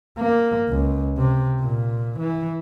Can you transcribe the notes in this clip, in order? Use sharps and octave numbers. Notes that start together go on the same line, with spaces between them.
A#3
C#2
C3
A#2
E3